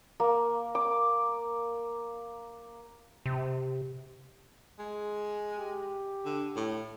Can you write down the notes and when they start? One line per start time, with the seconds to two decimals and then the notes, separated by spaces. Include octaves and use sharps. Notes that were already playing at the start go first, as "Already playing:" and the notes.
0.20 A#3
0.75 D6
3.26 C3
4.79 G#3
5.58 G4
6.25 D3
6.56 A2